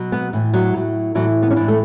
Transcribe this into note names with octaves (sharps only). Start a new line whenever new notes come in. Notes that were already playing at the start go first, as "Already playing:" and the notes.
Already playing: B2 F#3
B3
A2 E3
F#3
A2 F#3
A2 E3 F#3
B3
C#4
A2 E3 D4
A3